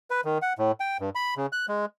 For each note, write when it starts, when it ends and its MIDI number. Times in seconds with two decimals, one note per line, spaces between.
0.10 0.21 71
0.25 0.38 51
0.42 0.53 78
0.59 0.72 45
0.80 0.97 79
1.00 1.10 43
1.15 1.34 83
1.37 1.46 49
1.52 1.66 90
1.69 1.85 56